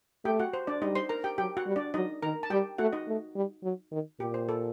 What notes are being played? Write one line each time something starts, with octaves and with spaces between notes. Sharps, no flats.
A3 G4 G5
F#4 F#5
C5
D4 D5
G3 D#4 D#5
C5 C6
A#4 A#5
G4 G5
F#3 G4 G5
F#4 F#5
G3
D4 D5
F#3 D#4 D#5
D#3 A#4 A#5
A5
G3 G4 G5
A3 F#4 F#5
D#4 D#5
A3
G3
F#3
D#3
A#2 G4
C5
A4